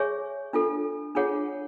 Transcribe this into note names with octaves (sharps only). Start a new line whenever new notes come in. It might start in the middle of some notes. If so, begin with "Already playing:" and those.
Already playing: G#4 C#5 E5 G#5 C#6
D4 F4 A4
D4 F4 G#4 C#5 F#5